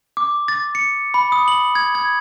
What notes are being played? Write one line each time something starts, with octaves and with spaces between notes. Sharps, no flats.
D6
A6
C#7
B5
D#6
F#7
G#6
G#6